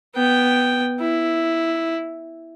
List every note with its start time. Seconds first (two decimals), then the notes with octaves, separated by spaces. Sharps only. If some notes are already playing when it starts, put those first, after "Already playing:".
0.15 B3 G5
1.00 E4